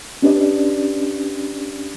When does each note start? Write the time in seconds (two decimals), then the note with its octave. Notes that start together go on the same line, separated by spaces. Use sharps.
0.22 C#4 D4 G4 B4 D5 D#5